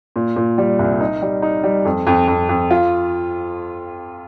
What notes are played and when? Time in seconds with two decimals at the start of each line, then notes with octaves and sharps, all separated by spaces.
0.16 A#2
0.36 A#2
0.58 G3
0.79 C2
1.01 D#4
1.22 G3
1.42 D#4
1.64 G3
1.85 F2
2.07 F2
2.27 F2
2.49 F2
2.71 F4